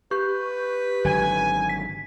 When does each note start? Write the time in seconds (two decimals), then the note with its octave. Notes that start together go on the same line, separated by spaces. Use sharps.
0.11 G4 B4 C#6 G6
1.05 G#1 D3 F#3 G#5
1.69 B6